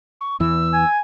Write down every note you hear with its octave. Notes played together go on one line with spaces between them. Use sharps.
C#6
E2 E3 E6
G#5